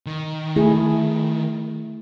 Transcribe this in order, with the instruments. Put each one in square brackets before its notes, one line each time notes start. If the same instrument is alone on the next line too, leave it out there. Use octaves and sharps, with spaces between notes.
[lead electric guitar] D#3
[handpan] A3 E4 G#4